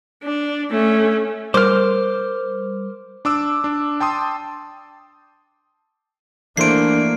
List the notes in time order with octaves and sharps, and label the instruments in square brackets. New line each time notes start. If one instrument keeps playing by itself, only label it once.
[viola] D4
A3 C#4
[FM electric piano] G3 [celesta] A#4 [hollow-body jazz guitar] C5 [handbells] D6 F6
[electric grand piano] D4 D6 E6
D4
G5 A5 C6 D#6
[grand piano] E3 A3 C5 [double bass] A#3 [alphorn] D4 [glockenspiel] C7 D7